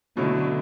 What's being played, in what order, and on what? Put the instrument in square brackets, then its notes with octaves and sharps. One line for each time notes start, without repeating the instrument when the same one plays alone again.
[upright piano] B2 F#3 A3 C#4 E4 [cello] D3